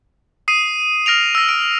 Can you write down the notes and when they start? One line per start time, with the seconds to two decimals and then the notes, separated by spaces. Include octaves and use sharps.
0.48 D#6 C7 D#7
1.06 F6 A#6 D7 F7
1.35 E6 A#6
1.49 D7